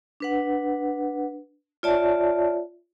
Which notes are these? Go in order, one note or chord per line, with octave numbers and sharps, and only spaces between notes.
D4 B4 F#5
F4 C#5 D5 E5 A5